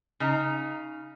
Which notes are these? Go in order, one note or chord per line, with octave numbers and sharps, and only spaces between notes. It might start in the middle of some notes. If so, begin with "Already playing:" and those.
C#3 D#4 A#5